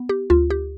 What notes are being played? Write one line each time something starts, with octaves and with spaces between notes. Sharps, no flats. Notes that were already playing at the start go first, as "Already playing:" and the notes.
Already playing: B3
G4
D2 F4
G4